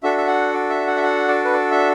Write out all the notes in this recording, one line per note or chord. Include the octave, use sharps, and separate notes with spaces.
D4 F#4 A4 E5
E5
F#5
D5
E5
F#5
E5
F#5
D5
B4
D5
E5